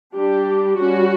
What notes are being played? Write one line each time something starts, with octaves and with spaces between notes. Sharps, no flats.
G3 D4 G4
G3 C#4 F#4